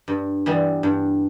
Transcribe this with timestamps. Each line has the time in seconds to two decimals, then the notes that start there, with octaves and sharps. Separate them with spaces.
0.08 G2
0.46 E3 G3 B3
0.83 G2